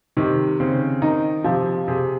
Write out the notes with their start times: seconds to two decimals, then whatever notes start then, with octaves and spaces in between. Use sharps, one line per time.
0.17 C3 D#3
0.60 C#3 C4
1.02 D#3 D#4
1.44 C3 F3
1.88 C3 G#4